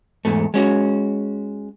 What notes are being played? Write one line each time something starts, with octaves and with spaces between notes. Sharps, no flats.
E2 G#2 A3
G#3 C#4 F#4